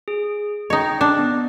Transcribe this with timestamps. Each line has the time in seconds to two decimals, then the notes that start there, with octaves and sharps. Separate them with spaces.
0.08 G#4
0.70 D#4 C#5 D#5 G5
1.01 D4
1.19 B3